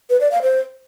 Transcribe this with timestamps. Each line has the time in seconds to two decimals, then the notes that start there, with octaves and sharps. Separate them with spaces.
0.10 B4
0.21 D5
0.32 F5
0.42 C5